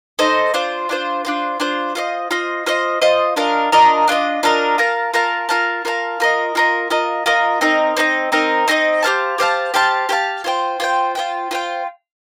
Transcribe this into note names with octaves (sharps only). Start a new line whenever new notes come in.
D#4 A4 C5 D#5
D4 F4 C5
D4 F4 C5
D4 F4 C5
D4 F4 C5
F4 C5 D#5
F4 C5 D#5
F4 C5 D#5
F4 C5 D#5
D4 F4 A#4 D#5
D4 F4 A#4 D#5
D4 F4 A#4 D#5
D4 F4 A#4 D#5
F4 A#4 F5 A5
F4 A#4 F5 A5
F4 A#4 F5 A5
F4 A#4 F5 A5
F4 A#4 D#5
F4 A#4 D#5
F4 A#4 D#5
F4 A#4 D#5
C4 D#4 A#4 D#5
C4 D#4 A#4 D#5
C4 D#4 A#4 D#5
C4 D#4 A#4 D#5
G4 C5 F5 A5
G4 C5 F5 A5
G4 C5 F5 A5
G4 C5 F5 A5
F4 C5 G5
F4 C5 G5
F4 C5 G5
F4 C5 G5